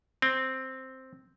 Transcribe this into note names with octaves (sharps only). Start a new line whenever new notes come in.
C4